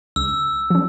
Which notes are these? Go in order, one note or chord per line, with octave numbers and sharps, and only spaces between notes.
C#2 E6
F3 C#4